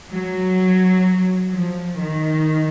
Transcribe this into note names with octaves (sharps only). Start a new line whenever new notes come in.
F#3
F3
D#3